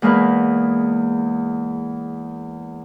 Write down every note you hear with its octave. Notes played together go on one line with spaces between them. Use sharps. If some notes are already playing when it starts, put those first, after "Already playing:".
E2 G#3 A#3 A#4 B4